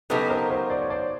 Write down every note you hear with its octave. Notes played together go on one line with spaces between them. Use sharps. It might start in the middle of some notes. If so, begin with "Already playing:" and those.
C#3 F#3 B3 D#4 G4 A4 B4
A#4 C5
A#4 C5
C5 D5
C#5
C5 D5